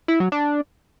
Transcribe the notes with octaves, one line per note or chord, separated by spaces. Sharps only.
E4
F#3
D4